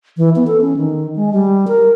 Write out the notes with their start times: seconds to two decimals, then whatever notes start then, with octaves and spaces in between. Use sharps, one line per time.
0.17 E3
0.36 B3
0.47 A4
0.61 C#4
0.77 D#3
1.16 G#3
1.33 G3
1.68 A#4